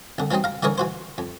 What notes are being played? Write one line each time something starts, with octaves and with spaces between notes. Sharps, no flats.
C2 D3
E3 F#3 G3 C4 D#4
F5 A#5
D3 E3 C#4 D#4 A#4 C#5
E3 F#4 C5
F2